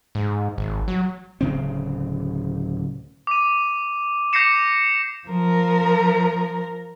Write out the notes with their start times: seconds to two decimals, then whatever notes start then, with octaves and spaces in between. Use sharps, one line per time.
0.15 G#2
0.58 G#1
0.88 F#3
1.41 D1 C#3 C4
3.27 D6 D#7
4.33 D6 G6 A#6 C7 C#7 E7
5.28 F3 A#4